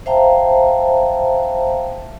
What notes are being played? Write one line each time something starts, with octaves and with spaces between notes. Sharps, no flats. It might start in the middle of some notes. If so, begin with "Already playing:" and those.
C5 E5 F5 G5 A5 A#5